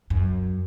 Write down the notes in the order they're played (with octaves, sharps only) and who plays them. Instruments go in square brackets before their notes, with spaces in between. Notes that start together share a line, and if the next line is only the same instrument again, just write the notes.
[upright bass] F#2